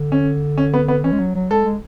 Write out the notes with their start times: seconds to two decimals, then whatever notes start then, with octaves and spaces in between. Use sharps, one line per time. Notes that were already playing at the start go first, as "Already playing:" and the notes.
Already playing: D3
0.12 C#4
0.57 C#4
0.74 B3
0.88 B3
1.04 E3 C#4
1.12 G#3
1.19 F#3
1.35 F#3
1.50 G#3 A4
1.65 G#3